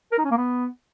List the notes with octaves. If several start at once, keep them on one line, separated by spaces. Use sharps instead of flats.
A#4
D#4
C#4
A#3
B3